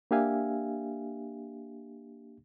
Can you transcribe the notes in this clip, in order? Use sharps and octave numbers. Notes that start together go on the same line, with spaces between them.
A#3 D4 G4 E5 F5 G#5